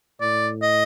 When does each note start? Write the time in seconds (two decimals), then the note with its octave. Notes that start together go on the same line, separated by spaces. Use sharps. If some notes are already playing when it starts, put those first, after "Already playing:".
0.20 A2 D5
0.62 D#5